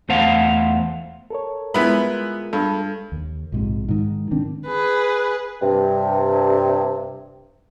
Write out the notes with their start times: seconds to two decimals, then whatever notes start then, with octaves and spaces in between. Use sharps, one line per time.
0.09 E2 A3 C5 F5 F#5
1.30 A4 A#4 C#5
1.74 G#3 B3 E4 F4 A#4 B4 B5
2.53 G2 A4
3.12 D#2
3.52 A#1 G#2 C3
3.88 G#2 D#3
4.31 D#3 C4 D4
4.66 G#4 B4
5.62 G2 C3